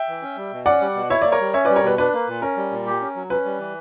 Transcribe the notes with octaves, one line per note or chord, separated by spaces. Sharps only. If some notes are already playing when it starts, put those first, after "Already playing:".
Already playing: E5 G5
E3
C#4
G3
B2
C#4 D5 F#5
G3
B2
E4 C#5 E5
A#3 D5
A#4 C#5
G3
C#4 C#5 E5
G3 B4 D5
A#4 C#5
B2 B4
D4 B4
A#3
A#2
C#4 A#4
G3
A#2
G4
C#4
F#3
C#4 B4
G3
E3